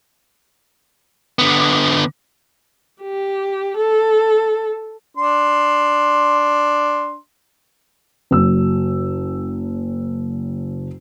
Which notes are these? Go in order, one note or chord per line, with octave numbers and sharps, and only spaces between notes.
D3 B3
G4
A4
D4 C6
F#1 F#3 E6